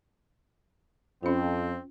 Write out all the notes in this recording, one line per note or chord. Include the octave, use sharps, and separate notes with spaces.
F2 C4 C#4 F4